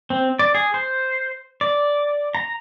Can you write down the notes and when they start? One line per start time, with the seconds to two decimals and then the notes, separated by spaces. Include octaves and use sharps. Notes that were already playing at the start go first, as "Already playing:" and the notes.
0.10 C4
0.39 D5
0.55 G#4
0.74 C5
1.61 D5
2.35 A#5